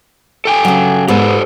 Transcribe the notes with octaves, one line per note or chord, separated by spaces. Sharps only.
A4 G5 G#5
C#3 F#3
G#2 B3 G4 A4 C5